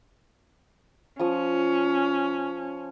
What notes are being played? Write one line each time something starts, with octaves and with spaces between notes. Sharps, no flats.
F3 C#4 C#6 D#6